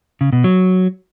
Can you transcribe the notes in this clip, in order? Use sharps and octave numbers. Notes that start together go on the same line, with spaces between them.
C#3
B2
F#3